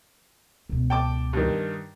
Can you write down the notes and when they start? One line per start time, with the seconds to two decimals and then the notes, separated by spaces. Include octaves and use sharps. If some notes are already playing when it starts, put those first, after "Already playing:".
0.69 C#2 B2
0.90 G5 A5 D6
1.33 G2 D#3